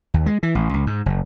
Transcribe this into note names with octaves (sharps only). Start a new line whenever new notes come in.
D#2
G#3
E3
A1
C#2
G#2
F#1